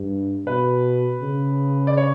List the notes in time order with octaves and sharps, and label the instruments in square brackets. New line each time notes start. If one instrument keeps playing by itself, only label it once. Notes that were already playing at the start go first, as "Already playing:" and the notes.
Already playing: [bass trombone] G2
[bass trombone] B2 [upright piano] B4
[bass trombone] C#3
[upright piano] D5
C#5